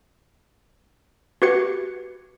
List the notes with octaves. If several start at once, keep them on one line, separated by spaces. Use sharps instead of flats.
F#4 G4 B4 G#6 C#7